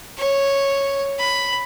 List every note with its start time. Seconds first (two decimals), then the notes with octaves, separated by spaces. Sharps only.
0.18 C#5
1.19 B5